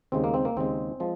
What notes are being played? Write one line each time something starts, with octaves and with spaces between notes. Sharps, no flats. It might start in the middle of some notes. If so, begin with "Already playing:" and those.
D#2 C#3 G#3 C4
A#3
C4
A#3
D#2 C#3 G#3 C4
F3 G#3